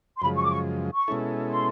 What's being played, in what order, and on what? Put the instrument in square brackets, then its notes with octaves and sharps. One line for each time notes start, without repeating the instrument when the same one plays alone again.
[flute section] C6
[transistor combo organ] F#2 C#3 F3 G#3 [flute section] B5
[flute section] C#6
D6
C#6
C#6
[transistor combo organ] B2 G#3 C#4 E4 A4
[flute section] C6